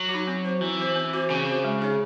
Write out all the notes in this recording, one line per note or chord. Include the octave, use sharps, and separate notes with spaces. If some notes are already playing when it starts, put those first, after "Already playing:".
Already playing: F#3
F#4
D#4
C4
F#4 C5
E3 C4
F#4 C5
C4
F#4 C5
C#3 C4
C5
F#4
G#3
D#4 G#4 C#5